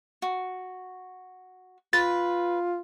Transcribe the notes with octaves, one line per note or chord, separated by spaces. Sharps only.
F#4
F4 B4 A6